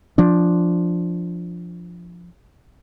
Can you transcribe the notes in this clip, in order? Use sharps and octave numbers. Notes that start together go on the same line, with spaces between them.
F3 D4